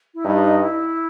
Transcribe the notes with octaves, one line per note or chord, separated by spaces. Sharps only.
E4
G2 D#4
D#4
E4